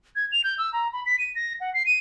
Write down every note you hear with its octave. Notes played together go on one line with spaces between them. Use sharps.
G#6
F7
G6
E6
A#5
B5
B6
D#7
A#6
F#5
C7
D#7